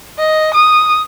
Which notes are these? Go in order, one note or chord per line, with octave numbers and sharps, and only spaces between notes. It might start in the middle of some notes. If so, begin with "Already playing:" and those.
D#5
D#6